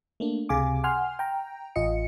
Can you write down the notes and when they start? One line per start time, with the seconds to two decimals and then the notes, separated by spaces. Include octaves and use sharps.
0.20 A3 A#3 D4
0.49 C#2 C3 G#4 F5 G#5 D6
0.84 F#5 G#5 C6 F6
1.19 G5 A#5
1.76 A1 F4 D#5 C#7